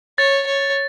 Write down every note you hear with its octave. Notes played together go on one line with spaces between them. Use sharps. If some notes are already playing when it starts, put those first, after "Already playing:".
C#5 A6
C#5